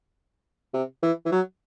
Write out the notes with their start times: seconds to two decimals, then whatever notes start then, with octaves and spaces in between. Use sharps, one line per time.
0.74 C3
1.03 E3
1.25 E3
1.32 F#3